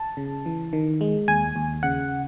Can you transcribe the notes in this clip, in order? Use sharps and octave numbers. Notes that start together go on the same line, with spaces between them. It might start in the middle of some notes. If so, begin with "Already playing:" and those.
Already playing: A5
C#3
E3
D#3
G#3
D#2 G#5
D#2
C#3 F#5